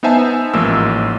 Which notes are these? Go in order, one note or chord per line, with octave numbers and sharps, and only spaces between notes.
B3 D#4 C5 E5 G#5 A5
A1 G#2 F3 A#3 E6